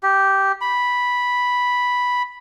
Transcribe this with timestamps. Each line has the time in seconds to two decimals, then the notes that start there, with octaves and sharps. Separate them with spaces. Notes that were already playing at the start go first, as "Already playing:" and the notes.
0.03 G4
0.61 B5